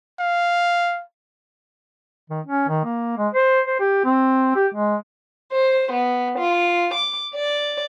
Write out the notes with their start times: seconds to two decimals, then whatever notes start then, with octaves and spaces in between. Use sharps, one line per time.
0.20 F5
2.30 D#3
2.47 C#4
2.69 D#3
2.85 A#3
3.18 G#3
3.33 C5
3.67 C5
3.80 G4
4.05 C4
4.56 G4
4.75 G#3
5.51 C5
5.91 B3
6.37 F4
6.92 D6
7.33 D5